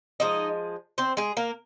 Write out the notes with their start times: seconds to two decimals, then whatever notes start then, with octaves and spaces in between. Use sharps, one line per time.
0.20 F3 G#3 D#4 D#5
0.98 C4 C5
1.17 G#3 G#4
1.37 A#3 A#4